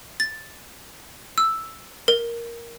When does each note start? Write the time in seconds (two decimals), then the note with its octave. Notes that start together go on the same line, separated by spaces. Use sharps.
0.20 A6
1.38 E6
2.08 A#4